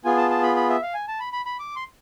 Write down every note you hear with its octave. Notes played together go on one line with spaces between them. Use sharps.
B3 F4 G#4 G#5
A5
A5
B5
B5
E5
F5
G#5
A5
B5
B5
B5
D6
C6